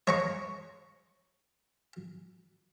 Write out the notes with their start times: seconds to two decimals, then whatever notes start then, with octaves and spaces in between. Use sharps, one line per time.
0.07 C#5 A#5 C#6